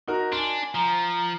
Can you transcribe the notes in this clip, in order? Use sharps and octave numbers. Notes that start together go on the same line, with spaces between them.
D#4 F#4 A#4
D4 G#5 C6
F3 A#5